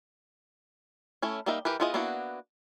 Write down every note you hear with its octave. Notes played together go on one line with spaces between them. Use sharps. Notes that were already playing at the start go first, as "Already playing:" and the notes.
A3 C#4 E4
G3 A#3 D#4 A#4 E5
E3 G4 A#4 B4
B3 E4 F4 G#4 D#5
A#3 B3 D4 E4 F#4